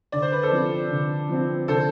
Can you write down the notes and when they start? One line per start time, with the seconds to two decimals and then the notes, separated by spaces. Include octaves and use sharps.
0.12 D3 D5
0.22 C5
0.32 B4
0.43 A4 C5
0.51 F3 C4
0.91 D3
1.29 F3 C4
1.68 D3 A4 C5